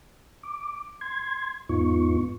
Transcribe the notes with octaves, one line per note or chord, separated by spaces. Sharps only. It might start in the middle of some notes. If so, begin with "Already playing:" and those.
D6
C6 G#6
E2 G#2 B3 D#4 F4 C#6